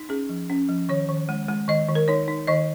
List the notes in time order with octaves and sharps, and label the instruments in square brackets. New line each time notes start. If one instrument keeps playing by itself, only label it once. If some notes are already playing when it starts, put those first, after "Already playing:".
Already playing: [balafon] D#4
C#4 G#4
F3
C#4
F3
D#3 C#5
D#3
G#3
G#3
D#3 D#5
D#3
A#4
D#4 C#5
D#4
D#3 D#5